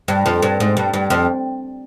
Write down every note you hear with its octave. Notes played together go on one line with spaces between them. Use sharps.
G2
F2
G2
G#2
G2
G2
F2